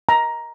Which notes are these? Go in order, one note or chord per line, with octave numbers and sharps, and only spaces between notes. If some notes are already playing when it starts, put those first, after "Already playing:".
A#5